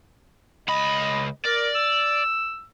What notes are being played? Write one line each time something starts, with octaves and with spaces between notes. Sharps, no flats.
C#2 D#5 B5
A#4 D5
E6